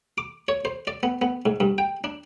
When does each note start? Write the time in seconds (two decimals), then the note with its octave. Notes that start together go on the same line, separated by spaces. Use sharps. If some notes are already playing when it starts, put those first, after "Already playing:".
0.18 D6
0.48 C#5
0.65 C5
0.87 D5
1.03 B3
1.22 B3
1.46 G#2
1.60 G2
1.78 G5
2.04 D4